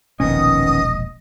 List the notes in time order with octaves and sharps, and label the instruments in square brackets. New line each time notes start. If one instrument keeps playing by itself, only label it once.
[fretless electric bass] E1 A#1 [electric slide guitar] D#3 B3 C#4 [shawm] D#5 [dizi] D#6